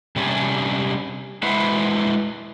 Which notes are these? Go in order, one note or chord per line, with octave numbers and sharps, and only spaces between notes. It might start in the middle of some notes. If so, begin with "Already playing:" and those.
C3 G3 C#4 D4 G#4
G#3 E4 B4 C5 E5 F#5